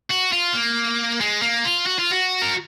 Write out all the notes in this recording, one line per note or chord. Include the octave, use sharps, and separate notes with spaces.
F#4
F4
A#3
G#3
A#3
F4
F#4
F4
F#4
A#4